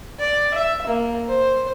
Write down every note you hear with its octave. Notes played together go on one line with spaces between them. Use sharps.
D5
E5
A#3
C5